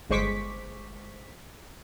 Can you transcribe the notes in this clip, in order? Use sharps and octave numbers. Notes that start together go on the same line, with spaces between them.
G1 G#3 C5 C#6 D6 B6